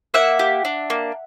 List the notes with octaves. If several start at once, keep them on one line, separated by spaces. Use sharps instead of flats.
A#3 E5 F#5
G4
D4
A#3